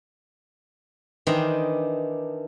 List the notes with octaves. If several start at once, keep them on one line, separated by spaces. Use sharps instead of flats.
D#3 E3 D4 C5 D#5 G5